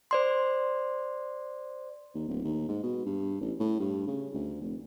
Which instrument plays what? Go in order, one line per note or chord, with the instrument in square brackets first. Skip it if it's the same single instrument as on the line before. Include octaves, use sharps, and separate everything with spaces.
[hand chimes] C5 D5 C6
[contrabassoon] D#2
D1
D#2
G#2
B2
G2
A1
A2
G2
C#3
D2
F1